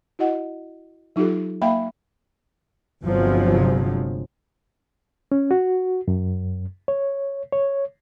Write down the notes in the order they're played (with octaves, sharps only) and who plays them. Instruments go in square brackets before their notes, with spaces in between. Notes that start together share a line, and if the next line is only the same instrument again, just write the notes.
[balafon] E4 F#4 D#5 F#5
F#3 D#4 F4 G4 A4
A#3 E5 F5 G5 B5
[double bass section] G1 C2 C3 F3 F#3 G#3
[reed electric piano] C#4
F#4
F#2
C#5
C#5